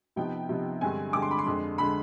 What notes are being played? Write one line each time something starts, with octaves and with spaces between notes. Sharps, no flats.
C3 F3 B3 D#4 G5
C3 F3 B3 D#4
G2 D3 G#3 C4 G#5
G2 D3 G#3 C4 D6
C6
B5
C6
F2 D3 G#3
D3 G#3 B5